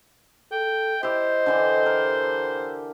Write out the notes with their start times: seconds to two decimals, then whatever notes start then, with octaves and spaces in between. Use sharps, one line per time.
0.52 A4 G5
1.03 E4 G4 C5 D#5
1.46 D3 E3 D4
1.86 A#4